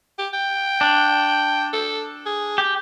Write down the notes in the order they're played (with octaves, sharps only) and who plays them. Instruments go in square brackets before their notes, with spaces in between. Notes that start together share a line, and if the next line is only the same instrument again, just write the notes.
[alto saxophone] G4
G5
[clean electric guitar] D4
[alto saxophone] A4
G#4
[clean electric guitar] G4